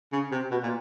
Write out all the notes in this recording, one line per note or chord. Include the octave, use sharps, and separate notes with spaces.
C#3
C3
B2
A#2